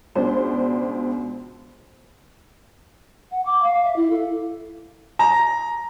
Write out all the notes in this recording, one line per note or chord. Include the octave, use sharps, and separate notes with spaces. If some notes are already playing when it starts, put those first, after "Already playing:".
C#2 B2 D4 C5
F#5
D6
F5
E5
E4
A4
A#5